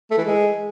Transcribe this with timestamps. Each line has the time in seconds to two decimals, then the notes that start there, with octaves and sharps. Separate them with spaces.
0.11 A3
0.18 E3
0.25 G#3